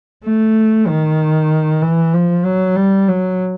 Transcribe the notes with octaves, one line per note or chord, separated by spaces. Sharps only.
A3
D#3
E3
F3
F#3
G3
F#3